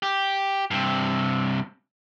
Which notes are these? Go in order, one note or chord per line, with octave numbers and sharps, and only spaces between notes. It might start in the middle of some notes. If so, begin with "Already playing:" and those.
G4
G2 C3